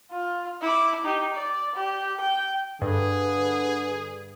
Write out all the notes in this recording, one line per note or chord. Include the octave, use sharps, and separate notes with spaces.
F4
E4 D6
D#4 G4
D5
G4
G5
G2 D3 G#4 B4